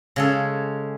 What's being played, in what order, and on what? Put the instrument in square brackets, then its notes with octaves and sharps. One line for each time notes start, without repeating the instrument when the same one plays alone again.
[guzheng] C#3 G#3 A4